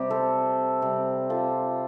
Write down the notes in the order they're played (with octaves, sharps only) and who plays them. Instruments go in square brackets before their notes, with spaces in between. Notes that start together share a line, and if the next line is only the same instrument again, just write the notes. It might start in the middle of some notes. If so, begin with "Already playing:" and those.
Already playing: [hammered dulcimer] C3 G3 G4
A4 C5
C3 G3
F4 A4